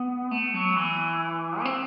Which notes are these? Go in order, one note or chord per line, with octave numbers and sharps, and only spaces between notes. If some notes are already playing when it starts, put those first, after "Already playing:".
Already playing: B3
A3
F#3
E3
B3
C4